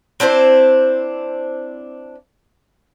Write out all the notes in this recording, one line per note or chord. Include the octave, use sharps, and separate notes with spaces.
C4 D4 E4 C5